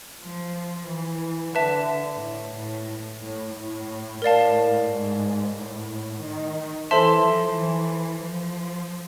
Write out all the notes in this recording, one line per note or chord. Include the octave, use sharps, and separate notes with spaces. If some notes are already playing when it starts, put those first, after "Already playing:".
F3
E3
D3 B4 E5 A5
A2
A2
A2
A2
A2 A#4 D5 F5 A5
G#2
A2
D#3
E3 A4 C5 E5 A5 C6
F3
E3
F3